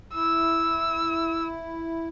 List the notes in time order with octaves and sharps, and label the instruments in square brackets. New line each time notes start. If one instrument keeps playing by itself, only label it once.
[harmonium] E4 [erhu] E6